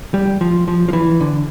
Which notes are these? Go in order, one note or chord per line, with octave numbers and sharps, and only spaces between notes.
G3
F3
F3
F3
E3
D3